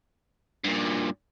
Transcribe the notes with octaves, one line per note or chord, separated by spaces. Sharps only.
G2 A#2